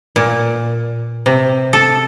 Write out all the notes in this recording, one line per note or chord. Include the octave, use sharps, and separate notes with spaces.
A#2
C3
A4